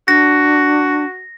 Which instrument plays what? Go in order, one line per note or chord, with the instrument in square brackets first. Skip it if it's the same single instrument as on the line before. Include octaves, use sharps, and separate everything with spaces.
[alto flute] D4 [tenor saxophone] F#4 [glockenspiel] A#6